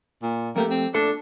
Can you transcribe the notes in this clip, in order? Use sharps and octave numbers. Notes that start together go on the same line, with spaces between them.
A#2
F2 A3 A#3 G4
C4
A#2 A3 D4 A4